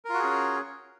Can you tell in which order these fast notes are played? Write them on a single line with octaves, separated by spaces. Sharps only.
A#4 F4 F#4 G#4 C#4